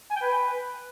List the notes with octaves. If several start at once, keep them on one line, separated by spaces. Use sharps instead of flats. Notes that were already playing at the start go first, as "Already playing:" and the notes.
G#5
G5
B4